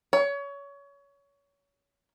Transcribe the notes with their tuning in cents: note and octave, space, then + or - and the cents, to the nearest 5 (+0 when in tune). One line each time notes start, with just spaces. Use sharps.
C#5 +25